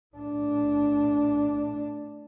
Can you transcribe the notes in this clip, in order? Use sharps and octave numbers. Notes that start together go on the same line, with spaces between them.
A2 D4